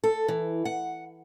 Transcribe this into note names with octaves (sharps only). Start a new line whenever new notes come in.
A4
E3
F#5